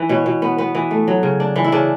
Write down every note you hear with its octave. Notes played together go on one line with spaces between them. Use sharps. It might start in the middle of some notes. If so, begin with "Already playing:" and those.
Already playing: E3
B2 C#5
B2
B3
B3
E3
A3
F#3
C#3
D4
E3
E4
C#3 D4